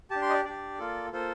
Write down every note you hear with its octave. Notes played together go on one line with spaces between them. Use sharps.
D4 G4 A5
C6
D#5
D5
D4 G4 D5
A#3 F4 A4
A#3 F4 A4 C5